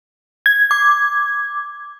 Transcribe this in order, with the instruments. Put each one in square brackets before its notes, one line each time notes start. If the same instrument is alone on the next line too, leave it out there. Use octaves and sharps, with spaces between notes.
[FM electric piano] G#6
[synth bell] D6